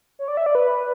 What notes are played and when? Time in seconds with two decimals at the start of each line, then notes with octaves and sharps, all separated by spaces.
0.19 C#5
0.28 D5
0.37 E5
0.46 D5
0.55 B4